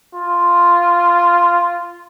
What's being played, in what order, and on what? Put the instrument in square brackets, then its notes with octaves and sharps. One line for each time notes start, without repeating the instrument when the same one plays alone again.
[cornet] F4